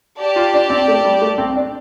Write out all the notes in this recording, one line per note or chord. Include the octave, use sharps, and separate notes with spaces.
G4 D5 A5
F4
D4
C4
A3
G3
A3
C4
D4